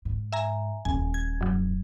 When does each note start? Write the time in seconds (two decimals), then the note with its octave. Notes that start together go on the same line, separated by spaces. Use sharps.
0.05 G#2
0.32 E5 G#5 A#5
0.85 D#1 A#2 G#5
1.14 G#6
1.41 F#2 F#3